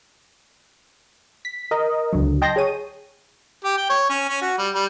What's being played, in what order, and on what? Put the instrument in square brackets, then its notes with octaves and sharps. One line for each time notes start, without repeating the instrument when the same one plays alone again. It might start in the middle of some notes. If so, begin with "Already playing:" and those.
[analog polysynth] B6
A#4 D#5
C#2 D3 F#3
D#5 G5 A5 C6 G6 A#6
G#4 C#5 D#7
[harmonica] G4
G5
C#5
C#4
C#4
F#4
G3
G3